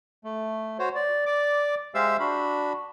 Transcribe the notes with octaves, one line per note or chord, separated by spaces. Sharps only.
A3
F#4 C5 C#5
D5
D5 D6
G#3 G4 C5 E5 F5 E6
D4 F#4 B5